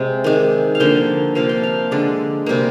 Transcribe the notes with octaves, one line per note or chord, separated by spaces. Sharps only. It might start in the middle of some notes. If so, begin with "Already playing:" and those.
Already playing: C3 G#3
D#3 G#3
F5
D3 F3 A#3 G5
C3 F3 A#3 F5
G5
F5
D3 G#3 D5
C3 G3 A#3